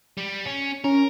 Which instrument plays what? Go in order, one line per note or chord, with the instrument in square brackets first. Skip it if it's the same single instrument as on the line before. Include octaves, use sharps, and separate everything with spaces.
[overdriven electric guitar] G3
C#4
[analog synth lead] C#4 [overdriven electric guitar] A#4